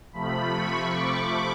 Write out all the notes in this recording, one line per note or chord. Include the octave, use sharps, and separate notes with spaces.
C3 F3 A3 B5
C#6
D6